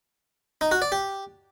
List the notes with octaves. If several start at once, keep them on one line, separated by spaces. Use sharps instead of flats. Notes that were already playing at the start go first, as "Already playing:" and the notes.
D#4
F#4
D5
G4